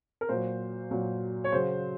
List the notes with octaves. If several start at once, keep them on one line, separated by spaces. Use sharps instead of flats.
A#4
A#2 F#3 C5
A#2 F#3
C#5
C#3 F#3 C5